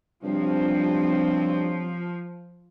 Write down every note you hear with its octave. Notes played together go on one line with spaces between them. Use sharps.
G2 C3 F3 F#3 C4